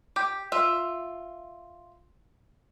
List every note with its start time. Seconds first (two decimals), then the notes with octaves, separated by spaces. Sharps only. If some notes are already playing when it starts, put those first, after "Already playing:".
0.16 G4
0.52 F4 E5